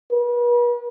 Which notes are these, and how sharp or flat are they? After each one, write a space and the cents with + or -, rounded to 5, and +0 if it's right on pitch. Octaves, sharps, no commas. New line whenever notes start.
B4 -40